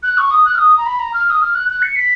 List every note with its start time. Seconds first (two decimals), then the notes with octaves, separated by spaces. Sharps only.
0.03 F#6
0.18 C#6
0.31 D#6
0.45 F#6
0.55 F6
0.58 D#6
0.78 A#5
0.86 B5
0.99 A#5
1.14 F6
1.30 D#6
1.42 F6
1.55 F#6
1.69 F#6
1.82 C#7
1.96 B6